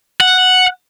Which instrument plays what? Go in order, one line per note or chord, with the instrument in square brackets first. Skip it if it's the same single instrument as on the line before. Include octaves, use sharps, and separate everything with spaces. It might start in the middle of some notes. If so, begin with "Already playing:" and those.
[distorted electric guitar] F#5